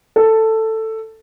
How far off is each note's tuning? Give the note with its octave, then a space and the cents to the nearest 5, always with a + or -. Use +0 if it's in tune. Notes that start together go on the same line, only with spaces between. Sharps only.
A4 +10